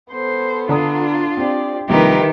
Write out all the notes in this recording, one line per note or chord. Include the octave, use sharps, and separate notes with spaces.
B3 A4 C5
D3 D4 F4 A#5 D#6
C4 G4 D5
C2 D#3 F3 A#3 G4 A#4 B4 E5